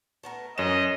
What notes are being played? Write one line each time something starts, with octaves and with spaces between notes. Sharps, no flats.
A3 B3 A#4
F#2 E3 C#4 D#5 E7